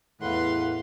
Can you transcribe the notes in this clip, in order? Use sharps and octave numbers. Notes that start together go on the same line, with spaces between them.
E2 A2 B4 F5 F#5 C6